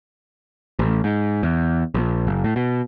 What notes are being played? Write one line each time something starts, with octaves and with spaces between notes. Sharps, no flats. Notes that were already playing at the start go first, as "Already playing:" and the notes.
A1
G#2
E2
A#1
F#1
A2
B2